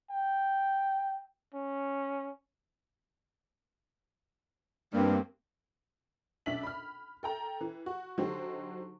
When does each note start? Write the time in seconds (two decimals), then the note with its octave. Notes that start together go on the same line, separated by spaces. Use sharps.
0.11 G5
1.54 C#4
4.92 G2 A#3 C4
6.46 B1 C#4 D4 E5 B6 F#7
6.63 B5 F6
7.23 A4 G5 A#5
7.61 E3
7.86 F#4
8.17 D3 F#3 D#4 G4 C5